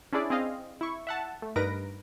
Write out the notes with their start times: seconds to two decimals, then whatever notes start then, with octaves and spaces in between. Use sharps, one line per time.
0.13 C#4 D4 E4 G#4 D5
0.30 C4 G#4 D#5 F5
0.81 E4 C#6
1.07 E5 F#5 A5
1.42 A3
1.56 G2 D#4 A#4 B4 A#6 D7